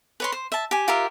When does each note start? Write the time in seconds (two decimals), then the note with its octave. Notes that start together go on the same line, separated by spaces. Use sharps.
0.20 B4 C#5 C6
0.32 C5
0.52 E5 A5
0.71 G4 G#5
0.88 F4 G4 A#4 E5